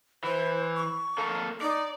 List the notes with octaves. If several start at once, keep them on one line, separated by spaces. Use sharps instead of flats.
E3 C5
C#6
A#3 A4
D#4 D5